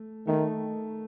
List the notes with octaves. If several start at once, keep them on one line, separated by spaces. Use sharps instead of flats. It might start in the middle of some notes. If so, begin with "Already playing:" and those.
Already playing: A3
D#3 A3